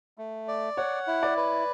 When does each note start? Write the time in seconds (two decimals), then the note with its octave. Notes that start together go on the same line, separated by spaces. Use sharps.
0.18 A3
0.48 D5
0.77 C#5 F#5
1.07 E4
1.23 D5
1.37 B4